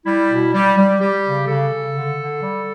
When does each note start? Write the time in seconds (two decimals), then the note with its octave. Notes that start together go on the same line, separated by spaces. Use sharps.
0.06 G3 E4
0.30 B2
0.54 G3
0.77 G3
1.01 G3 G4
1.24 C#3
1.48 C#3 A4
1.72 C#3
1.95 D3
2.18 D3
2.42 G3